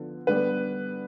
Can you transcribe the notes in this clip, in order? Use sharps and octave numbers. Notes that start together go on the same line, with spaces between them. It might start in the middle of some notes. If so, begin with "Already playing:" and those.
Already playing: D3 F3 B3
D3 G3 B3 B4